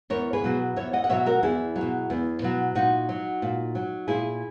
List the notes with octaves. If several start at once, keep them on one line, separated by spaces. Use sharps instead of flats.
E2 A#4 C#5
G#4 B4
B2 F#3
E2 C#5 E5
D#5 F#5
F#5
B2 F#3 C#5 E5
F#4 A#4
E2 E4 G#4
F#3
B2
E2
B2 F#3
A#2 D#4 F#4
F#3
A#2
F#3
A#2 E4 G#4